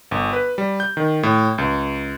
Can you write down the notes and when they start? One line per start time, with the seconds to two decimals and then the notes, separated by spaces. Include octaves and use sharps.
0.11 G1
0.33 B4
0.58 G3
0.80 G6
0.97 D#3
1.23 A2
1.58 C#2